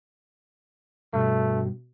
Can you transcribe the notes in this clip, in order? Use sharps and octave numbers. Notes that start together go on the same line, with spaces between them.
G2 B2 A3